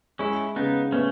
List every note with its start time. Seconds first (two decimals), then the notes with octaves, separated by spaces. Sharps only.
0.19 G#3 C#4 E4
0.56 C#3 B3 D#4
0.92 A3 B3 C#4